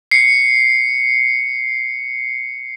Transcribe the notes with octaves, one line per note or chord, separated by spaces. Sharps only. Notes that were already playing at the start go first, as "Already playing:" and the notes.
C7 C#7